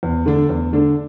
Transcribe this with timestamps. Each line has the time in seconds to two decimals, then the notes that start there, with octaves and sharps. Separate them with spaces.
0.03 E2
0.26 D3 A3 D4 A4
0.49 E2
0.73 D3 A3 D4 A4